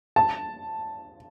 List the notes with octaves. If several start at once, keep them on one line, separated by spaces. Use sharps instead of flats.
A5